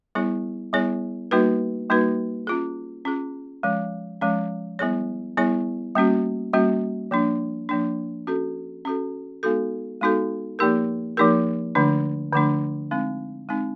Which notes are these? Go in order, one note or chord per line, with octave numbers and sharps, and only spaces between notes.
G3 B3 E4 G#4 C#5
G3 B3 E4 G#4 C#5
G3 A#3 D#4 F#4 B4
G3 A#3 D#4 F#4 B4
C#4 F4 G#4
C#4 F4 G#4
F3 G#3 C#4
F3 G#3 C#4
G3 B3 E4 G#4 C#5
G3 B3 E4 G#4 C#5
G3 A#3 C#4 F#4
G3 A#3 C#4 F#4
F3 A#3 D4
F3 A#3 D4
C#4 F#4 A4
C#4 F#4 A4
G#3 B3 D#4 F#4 A4
G#3 B3 D#4 F#4 A4
F3 A#3 D#4 G4 A#4
F3 A#3 D#4 G4 A#4
D3 F3 A3 D4
D3 F3 A3 D4
G#3 C4 D#4
G#3 C4 D#4